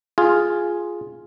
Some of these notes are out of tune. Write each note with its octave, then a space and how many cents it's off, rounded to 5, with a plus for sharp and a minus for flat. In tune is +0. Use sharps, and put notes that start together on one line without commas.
F4 +0 G#4 +0